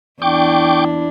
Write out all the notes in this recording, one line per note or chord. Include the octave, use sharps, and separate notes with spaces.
E2 D4 E4 G5 C#6 D6